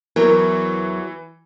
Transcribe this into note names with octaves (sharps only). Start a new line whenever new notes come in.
E2 E3 F#3 A#4